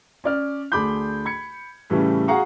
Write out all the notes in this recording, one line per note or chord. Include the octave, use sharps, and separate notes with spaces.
C#4 D5 F6
D2 D4 G#4 B5 D6 G6
B5 G#6 C#7
A2 C#3 E3 G3 A3 C#4
F#4 G#4 F5 F#5 A#5 C#6